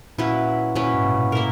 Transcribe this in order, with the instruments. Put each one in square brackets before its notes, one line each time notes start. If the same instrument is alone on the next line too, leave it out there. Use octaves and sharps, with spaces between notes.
[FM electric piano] A#2 [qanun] F#3 C#4 E4 B4
[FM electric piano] A#2 [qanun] F#3 C#4 E4 B4
[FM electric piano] G#2
B2
A#2
[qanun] A#3 E4 A#4